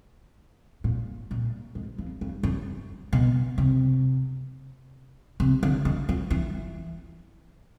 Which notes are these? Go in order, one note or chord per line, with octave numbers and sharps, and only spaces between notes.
A#2
A#2
G#2
F2
G2
F#2
B2
C3
C3
D3
D#3
F3
E3